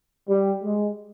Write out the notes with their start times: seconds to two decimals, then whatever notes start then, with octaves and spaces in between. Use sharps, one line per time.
0.28 G3
0.63 G#3